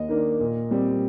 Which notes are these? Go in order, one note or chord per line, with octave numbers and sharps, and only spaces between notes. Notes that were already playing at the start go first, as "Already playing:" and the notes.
Already playing: D#2 D#5
D#3 A#3 D4
A#2
G3 C4